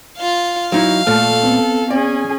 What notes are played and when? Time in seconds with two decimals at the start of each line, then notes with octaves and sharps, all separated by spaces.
0.18 F4 F5
0.72 F#3 D#4 E4 F5
1.07 A#2 A3 A4 F6
1.43 B3 C4
1.90 C#4 G#4 D5